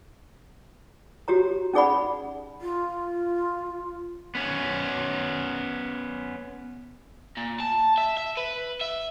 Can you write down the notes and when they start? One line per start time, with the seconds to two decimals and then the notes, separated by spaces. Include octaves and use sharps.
1.28 F#4 G4 C#5 A#5
1.74 C#4 D#4 G#4 D5 F#5 B5
2.61 F4
4.35 B3 C#4
7.37 A#2
7.60 A5
7.98 E5
8.17 E5
8.37 B4
8.81 E5